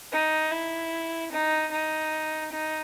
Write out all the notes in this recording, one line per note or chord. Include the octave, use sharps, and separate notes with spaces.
D#4
E4
D#4
D#4
D#4